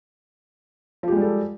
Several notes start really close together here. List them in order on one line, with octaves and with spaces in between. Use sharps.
F3 G4 G#3 G3 A4